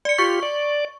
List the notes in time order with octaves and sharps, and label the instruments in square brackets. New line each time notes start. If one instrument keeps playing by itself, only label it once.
[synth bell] D5 C#7
[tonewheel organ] F4 G4 [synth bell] C#6
[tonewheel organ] D5